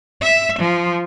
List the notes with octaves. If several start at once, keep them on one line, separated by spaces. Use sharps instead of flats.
E5
F3